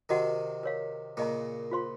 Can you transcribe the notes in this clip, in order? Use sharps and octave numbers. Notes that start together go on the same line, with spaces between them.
C3 D#3 F#4 A#4 D#5 F#5
A#4 C#5 F5
A#2 C#3 G#4 D#5 A#5
F4 C5 F5 C6